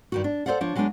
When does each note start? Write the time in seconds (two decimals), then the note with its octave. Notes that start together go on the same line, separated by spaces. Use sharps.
0.12 G2 D#3 F#4
0.24 D4
0.46 A4 B4 C5 D5 F5 F#5
0.61 F3 D4 C#5
0.76 F#3 G#3 B3 C4 D4 D#4